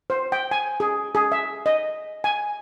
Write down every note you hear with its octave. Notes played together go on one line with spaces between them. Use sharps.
C5
G5
G#5
G#4
G#4
E5
D#5
G#5